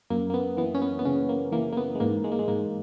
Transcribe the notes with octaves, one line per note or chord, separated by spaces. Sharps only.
F#2 A#3
A#3
B3
E3 B3
C#4
B3
B3
C#3 C#4
A#3
E3 A#3
A#3
B3
G#3
G#2 A#3
G#3
A#3
G#3
G#2 A#3